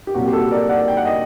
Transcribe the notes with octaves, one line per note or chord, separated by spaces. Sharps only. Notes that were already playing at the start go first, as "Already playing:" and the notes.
G4
C2 A#2 F#3 F#4
G4
F#4 A4
A#4 D5
D5 F#5
G5
F#5
D#5 G5